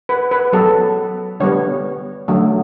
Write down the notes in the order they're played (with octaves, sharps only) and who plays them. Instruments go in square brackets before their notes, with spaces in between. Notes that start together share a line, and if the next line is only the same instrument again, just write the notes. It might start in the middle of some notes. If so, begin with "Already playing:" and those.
[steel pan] B4
B4
F#3 B3 A4
D3 G3 B3 C#5
D3 F#3 A3